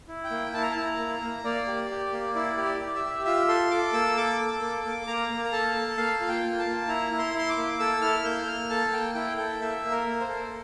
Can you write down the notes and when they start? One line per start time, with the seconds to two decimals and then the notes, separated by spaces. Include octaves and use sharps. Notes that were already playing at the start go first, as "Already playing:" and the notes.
0.08 E4
0.24 G5
0.31 A#3
0.54 E4 A5
0.63 A#5
0.71 A5
0.76 E4
0.84 A#5
0.99 A#3
1.14 A#5
1.22 A#3
1.44 A#3 D5
1.67 G4
1.90 G4
2.12 A#3
2.35 E4 D5
2.57 G4
2.65 D5
2.81 G4
2.95 E5
3.03 G4
3.25 F4 E5
3.48 A4 C6
3.71 A4 D6
3.93 A#3 E6
4.17 A4 D6
4.40 A4
4.61 A#3
4.85 A#3
5.07 A#3 A#5
5.29 A#3
5.44 A#5
5.52 A4 A5
5.75 A4
5.97 A#3 F5
6.20 F4
6.29 G5
6.43 A#3
6.59 A5
6.66 A#3
6.88 E4 A#5
7.11 E4
7.19 C6
7.34 E4 C6
7.49 D6
7.57 A#3
7.79 A4 E6
8.02 E4 F6
8.24 A#3 G6
8.48 A#3 F6
8.70 A4 A5
8.92 A#3 G5
9.15 E4 G5
9.37 A4 G5
9.61 A#3 E5
9.83 A#3
9.91 A#4
10.07 A#3
10.21 C5
10.29 A4